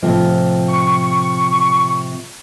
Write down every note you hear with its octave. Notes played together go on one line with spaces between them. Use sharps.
A2 C3 F3
C#6